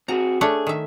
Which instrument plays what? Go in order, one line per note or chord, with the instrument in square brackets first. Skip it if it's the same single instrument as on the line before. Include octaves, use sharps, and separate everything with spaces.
[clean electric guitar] C4 F#4 G#4 [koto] A#5
[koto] A3 D4 C#5 [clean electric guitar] G#4
[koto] D#3 E5